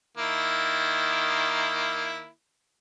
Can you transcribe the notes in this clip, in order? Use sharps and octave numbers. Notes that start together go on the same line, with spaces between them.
D#3 A#3 E4